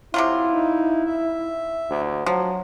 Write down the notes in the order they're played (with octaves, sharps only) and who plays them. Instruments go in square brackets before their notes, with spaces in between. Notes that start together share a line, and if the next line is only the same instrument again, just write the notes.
[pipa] C3 F#3 F4 [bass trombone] E4
[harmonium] D#4
E5
[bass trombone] D2
[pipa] F3 [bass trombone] F#3